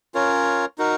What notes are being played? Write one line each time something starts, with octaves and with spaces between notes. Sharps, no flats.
C#4 F4 A#4 C#5
D#4 F#4 A#4